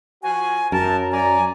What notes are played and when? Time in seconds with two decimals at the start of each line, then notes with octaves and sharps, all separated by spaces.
0.23 F3 F#4 G#5
0.72 F#2 A#4 A5
1.12 D5 G#5 A#5